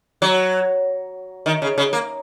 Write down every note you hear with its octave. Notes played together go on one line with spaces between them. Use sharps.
F#3
D#3
C#3
C#3
A#3